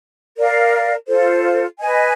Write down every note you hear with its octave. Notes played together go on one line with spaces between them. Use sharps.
A#4 D5 F5
F4 A4 C5
B4 D#5 G#5